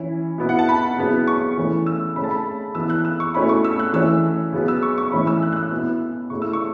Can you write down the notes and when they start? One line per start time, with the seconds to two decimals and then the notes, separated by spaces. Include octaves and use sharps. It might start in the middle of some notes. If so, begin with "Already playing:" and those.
Already playing: E3 C#4 E4
0.38 B2 B3 E4
0.49 F#5
0.59 A5
0.69 B5
0.98 C#3 F#3 B3 E4
1.28 C#6
1.57 E3 A3 C#4 E4
1.86 E6
2.16 C#3 A3 C#4 B5
2.24 A5
2.31 B5
2.75 E3 B3 E4 E6
2.90 F#6
3.05 E6
3.20 C#6
3.35 B2 A3 C#4 E4 B5
3.49 C#6
3.64 E6
3.79 F#6
3.93 E3 A3 C#4 E6
4.53 C#3 F#3 B3
4.68 E6
4.83 C#6
4.98 C#6
5.12 A2 E3 C#4 E4 B5
5.27 E6
5.42 F#6
5.52 F#6
5.56 E6
5.71 B2 B3 E4
6.30 C#3 A3 E4 C#6
6.42 E6
6.53 C#6